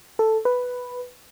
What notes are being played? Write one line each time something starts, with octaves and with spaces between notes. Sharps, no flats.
A4
B4